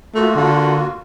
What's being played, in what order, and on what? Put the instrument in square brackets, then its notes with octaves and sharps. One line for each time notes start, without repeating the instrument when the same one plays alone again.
[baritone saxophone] A3 [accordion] A#3 F4 F#4
[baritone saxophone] D3